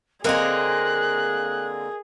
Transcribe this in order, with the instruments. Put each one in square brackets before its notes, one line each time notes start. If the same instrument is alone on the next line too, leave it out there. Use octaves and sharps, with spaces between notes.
[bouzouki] D3 A#3 C4 [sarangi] G#4 [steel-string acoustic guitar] A#4 D#5 G#5 [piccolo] F#6